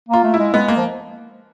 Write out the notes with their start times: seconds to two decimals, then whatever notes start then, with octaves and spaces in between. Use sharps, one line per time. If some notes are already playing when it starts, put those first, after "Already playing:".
0.09 A#3 F4
0.24 A3
0.34 E4
0.39 G#3
0.54 G#3 B3
0.68 A#3
0.77 F3